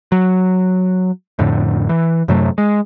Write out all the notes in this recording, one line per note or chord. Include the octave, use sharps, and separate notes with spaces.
F#3
F2 A2 D3
E3
F#2 C3 F#3 A3
G#3